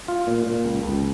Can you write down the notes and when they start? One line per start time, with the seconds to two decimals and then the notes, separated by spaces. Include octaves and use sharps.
0.08 F4
0.27 A#2
0.47 A#2
0.65 C#2
0.83 C#2